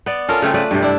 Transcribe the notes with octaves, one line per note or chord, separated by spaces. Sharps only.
B3 D5
C#4 F4 A4 A#4
C#3 A3 C4
A3 B4 D5
G2 C3
D4 E4